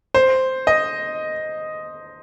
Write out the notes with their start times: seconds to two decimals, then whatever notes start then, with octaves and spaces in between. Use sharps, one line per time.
0.14 C5
0.67 D#5